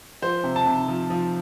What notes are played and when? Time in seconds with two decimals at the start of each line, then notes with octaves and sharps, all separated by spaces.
0.22 F3 C5
0.44 C3
0.56 A5
0.66 C3
0.88 F3
1.10 F3